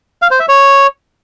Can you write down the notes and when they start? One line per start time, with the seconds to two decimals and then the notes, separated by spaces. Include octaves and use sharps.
0.22 F5
0.31 C5
0.40 E5
0.49 C#5